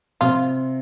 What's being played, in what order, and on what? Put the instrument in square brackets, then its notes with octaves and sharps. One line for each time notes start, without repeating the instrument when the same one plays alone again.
[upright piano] C3 [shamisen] F4